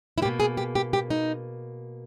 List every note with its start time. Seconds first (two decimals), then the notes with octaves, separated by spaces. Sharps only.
0.18 E4
0.22 A#3 G4
0.25 B2
0.40 G#4
0.57 G4
0.75 G4
0.93 G4
1.10 D#4